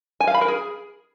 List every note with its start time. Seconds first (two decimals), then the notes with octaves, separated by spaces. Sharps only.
0.20 G#5
0.27 F5
0.34 B5
0.41 A#4
0.48 G#4